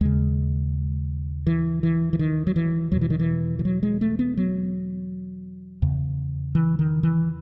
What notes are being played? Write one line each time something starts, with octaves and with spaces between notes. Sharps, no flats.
D#2 C#3 G#3
E3
E3
E3
D#3
F#3
E3
E2 B2 F#3
E3
D#3
E3
E3
F#3
G#3
A3
B3
F#3
E2 C#3
E3
D#3
E3